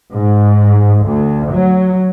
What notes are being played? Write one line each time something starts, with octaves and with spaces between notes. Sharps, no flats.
G#2
D2
F#3